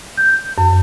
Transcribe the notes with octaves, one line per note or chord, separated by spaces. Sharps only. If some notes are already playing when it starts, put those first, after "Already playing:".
G6
F#2